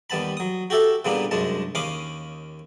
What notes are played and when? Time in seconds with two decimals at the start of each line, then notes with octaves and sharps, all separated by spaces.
0.10 D#2 G3 B3 A5 B5
0.37 F#3 D#6
0.70 F#4 G4 A4 E5 F#5
1.05 A#2 C#3 G3 A#3 B3 D4
1.31 C2 F#2 G#3 D4 A5
1.75 D#2 C#4 F5 B5 D6 D#6